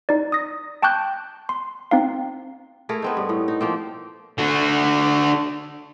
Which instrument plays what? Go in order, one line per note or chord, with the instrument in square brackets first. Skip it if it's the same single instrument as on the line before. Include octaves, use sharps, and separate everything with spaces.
[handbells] D#4 D5
D#6 A#6
G5 A5 C#6 D6 F#6 G6
C6
C4 D#4 F5
[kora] A3 E4 G#4 A#4
B3 C4 D#4
G2
A2
D#4
F3 A#3 C4
[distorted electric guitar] D3 F#4